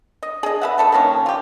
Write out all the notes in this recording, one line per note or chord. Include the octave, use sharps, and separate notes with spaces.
D#5
G#4 D#5
B4 E5 F#5
A3 A4 B4
D#3 F3 A#3 C#4
F4 G4